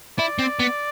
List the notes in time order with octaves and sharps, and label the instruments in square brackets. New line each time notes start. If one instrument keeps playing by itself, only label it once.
[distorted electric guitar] E4 [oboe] D5
[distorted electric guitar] C4
B3